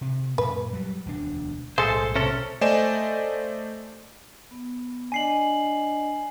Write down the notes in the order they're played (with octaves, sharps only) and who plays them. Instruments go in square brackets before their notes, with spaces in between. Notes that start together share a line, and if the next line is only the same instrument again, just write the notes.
[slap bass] C3
[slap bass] F#2 A#2 [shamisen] B4
[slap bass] F#3 G3
E1 D2 D4
[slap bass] B1 A2 [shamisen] G#3 [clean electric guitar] A4 C5
[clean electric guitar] C3 C#4 A4
[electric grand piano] A3 C5 D5 D#5 G#5 E7
[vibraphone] B3
[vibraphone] D4 D5 D#5 [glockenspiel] G#5 C7 F#7